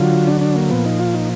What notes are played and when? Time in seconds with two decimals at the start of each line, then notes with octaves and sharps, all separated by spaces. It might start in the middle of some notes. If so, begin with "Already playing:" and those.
Already playing: D3 F#3 F4
0.27 D4
0.41 D4
0.56 A#3
0.70 A#2 F3 B3
0.85 D#4
1.00 F4
1.14 D#4